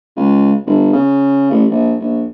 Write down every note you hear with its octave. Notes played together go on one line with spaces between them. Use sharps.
C#2
G1
C#3
A1
A#1
A#1